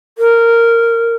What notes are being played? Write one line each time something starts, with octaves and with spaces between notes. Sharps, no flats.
A#4